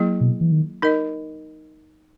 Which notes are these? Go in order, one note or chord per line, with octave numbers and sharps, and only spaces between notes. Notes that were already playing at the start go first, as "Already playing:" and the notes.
Already playing: F#3 A#3 E4 G#4
B2
E3
D#3
D#4 A#4 D#5